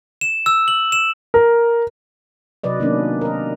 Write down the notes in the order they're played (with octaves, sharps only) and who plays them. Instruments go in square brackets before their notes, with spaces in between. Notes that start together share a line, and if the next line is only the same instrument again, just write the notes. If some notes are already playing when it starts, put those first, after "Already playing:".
[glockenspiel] E7
E6
F#7
E7
[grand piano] A#4
[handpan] C3 F#3 B4 D5 D#5
D#3 F#3 A#3 B3 C#4 D4
A#4 D#5